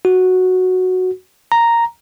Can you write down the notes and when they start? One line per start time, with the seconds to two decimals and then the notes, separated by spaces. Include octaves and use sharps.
0.05 F#4
1.52 A#5